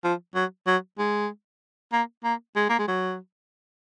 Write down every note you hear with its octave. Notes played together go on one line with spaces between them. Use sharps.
F3
F#3
F#3
G#3
A#3
A#3
G#3
A#3
G#3
F#3